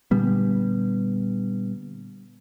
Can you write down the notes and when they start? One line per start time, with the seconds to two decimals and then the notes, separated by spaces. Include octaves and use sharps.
0.11 A#2 D3 G3 B3